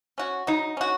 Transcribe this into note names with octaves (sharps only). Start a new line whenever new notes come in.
C#4 F#4
F#3 D#4
C#4 F#4